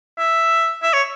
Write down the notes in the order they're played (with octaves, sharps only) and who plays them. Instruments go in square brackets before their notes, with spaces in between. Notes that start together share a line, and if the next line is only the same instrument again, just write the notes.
[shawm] E5
E5
C#5